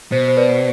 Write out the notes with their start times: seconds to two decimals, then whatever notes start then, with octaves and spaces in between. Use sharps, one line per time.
0.12 B2 C5
0.28 C5
0.37 B4 D5